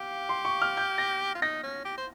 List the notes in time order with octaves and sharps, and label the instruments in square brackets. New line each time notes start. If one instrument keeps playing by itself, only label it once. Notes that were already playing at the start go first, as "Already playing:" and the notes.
Already playing: [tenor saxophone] G4 [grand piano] F5
[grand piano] C6
C#6
F6
G6
A#6
[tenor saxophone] F4
[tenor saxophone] D#4 [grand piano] A#6
[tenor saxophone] C#4
G4
C5